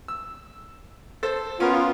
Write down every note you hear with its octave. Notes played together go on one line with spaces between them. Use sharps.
E6
A4 C5
B3 C#4 F4 A#4